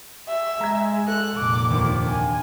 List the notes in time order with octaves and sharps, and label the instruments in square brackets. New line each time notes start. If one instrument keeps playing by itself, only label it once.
[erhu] E5
[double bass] G#3 [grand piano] A#5 G#6
[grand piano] A4 [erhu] F#6
[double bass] F1 A#2 [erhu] D6
[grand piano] D#2 D3 F3
[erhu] G#5